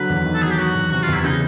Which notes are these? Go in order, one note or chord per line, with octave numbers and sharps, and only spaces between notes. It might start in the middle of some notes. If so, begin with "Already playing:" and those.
Already playing: D3 F#3 B4
E2
D#3
A4
F#3 G#4
G4
F#3 F#4
E2
C3 F#4
F4
E2
E4
C#3 D#4